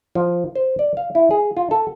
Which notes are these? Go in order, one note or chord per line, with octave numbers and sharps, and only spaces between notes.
F3
C5
D5
F5
E4
G#4
F4
A4